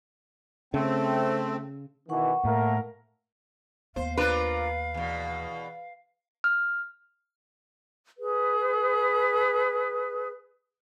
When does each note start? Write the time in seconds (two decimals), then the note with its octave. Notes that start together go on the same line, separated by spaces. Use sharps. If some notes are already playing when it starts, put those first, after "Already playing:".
0.74 C#3 A3 C4
2.09 B2 D#3 E3 F#5 C#6
2.45 A2 A3 A#3 A#4
3.96 D#2 B3 C5 F5
4.17 D4 F4 A#4 B4
4.94 E2 B2
6.44 F6
8.18 G#4 B4